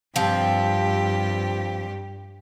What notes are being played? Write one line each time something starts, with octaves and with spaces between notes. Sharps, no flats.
G2 F3 C4 G4